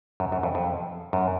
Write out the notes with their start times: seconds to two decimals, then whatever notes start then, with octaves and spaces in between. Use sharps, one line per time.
0.20 F#2
0.32 F#2
0.43 F2
0.55 F2
1.13 F#2